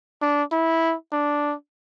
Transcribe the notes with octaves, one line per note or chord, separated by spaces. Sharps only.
D4
E4
D4